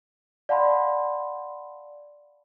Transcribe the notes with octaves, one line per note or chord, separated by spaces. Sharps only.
D5 F5 F#5 A5 B5 C6